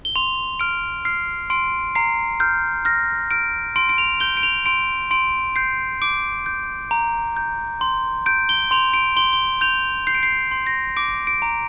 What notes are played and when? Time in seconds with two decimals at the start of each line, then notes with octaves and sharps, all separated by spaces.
0.05 G7
0.16 C6 F7
0.60 F6 D7
1.05 F6 C7
1.50 C6 D7
1.95 A#5 C7
2.40 F6 G6
2.85 F6 A#6
3.31 F6 D7
3.76 C6 D7
3.89 D7
3.98 F7
4.20 G6 G7
4.37 D7
4.43 F7
4.66 C6 D7
5.11 C6 D7
5.56 G6 C7
6.02 D6 D7
6.46 G6
6.91 A#5
7.37 G6
7.81 C6
8.26 G6 D7
8.49 G7
8.71 C6 F7
8.94 D7
9.16 C6 G7
9.33 G7
9.61 G6 F7
10.07 G6 C7
10.15 D7
10.23 C7
10.51 C6
10.67 A#6
10.96 D6 D7
11.27 D7
11.42 A#5